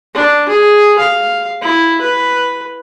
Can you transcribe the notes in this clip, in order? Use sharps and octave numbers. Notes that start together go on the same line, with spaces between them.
D4
G#4
F5
E4
B4